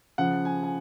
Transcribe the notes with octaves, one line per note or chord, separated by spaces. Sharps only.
C#3 F3 F#5
G#5
G#5